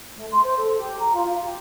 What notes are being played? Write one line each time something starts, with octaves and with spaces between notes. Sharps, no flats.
A3
C6
C5
A4
G4
A#5
F4
F5
G4